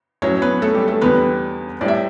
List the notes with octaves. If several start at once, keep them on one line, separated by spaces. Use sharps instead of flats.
A2 F#3 C#4 C#5
B3 B4
A3 A4
G3 G4
A3 A4
E2 D3 G3 B3 B4
A2 G3 D5
E5